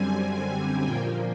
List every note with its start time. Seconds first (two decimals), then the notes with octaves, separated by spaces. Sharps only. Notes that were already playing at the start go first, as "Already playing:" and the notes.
Already playing: F#2 D3 G3 C4 G#5
0.26 G#5
0.85 A#2 F3 A#3 G5